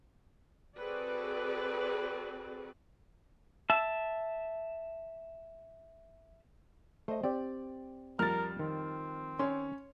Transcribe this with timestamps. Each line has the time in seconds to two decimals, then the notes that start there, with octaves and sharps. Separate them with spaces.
0.76 C4 F#4 G#4 A4 B4 D5
3.70 E5 A5
7.08 A3 C5 D#5
7.23 C4 G4 D5
8.19 F2 G3 A#4 F6 A6
8.59 D#3 C4
9.39 C#4 C#5 C6